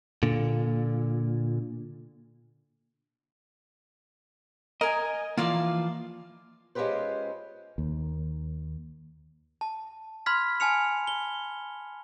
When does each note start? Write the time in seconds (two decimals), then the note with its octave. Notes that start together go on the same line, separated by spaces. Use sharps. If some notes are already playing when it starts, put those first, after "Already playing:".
0.23 A#2 D3
4.81 A#4 D#5 G#5
5.37 E3 F3 A#3 F4 D5 F5
6.75 G#3 C#4 F4 G4 B4 C5
7.78 D#2
9.61 A5
10.26 B5 C6 F6 G#6 B6
10.60 G#5 A5 F6 C#7 F7
11.07 G7